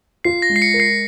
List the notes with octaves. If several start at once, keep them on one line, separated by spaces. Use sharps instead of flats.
F4 C7
A#6
G#3
C7
C#7
A#4
C7